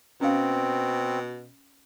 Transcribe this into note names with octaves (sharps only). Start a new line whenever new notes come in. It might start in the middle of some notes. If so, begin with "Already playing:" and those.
B2 C4 C#4 F5